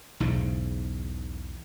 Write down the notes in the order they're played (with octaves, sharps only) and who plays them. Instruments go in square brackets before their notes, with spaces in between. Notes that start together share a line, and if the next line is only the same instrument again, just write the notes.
[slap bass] B1 E2 G#2 C#3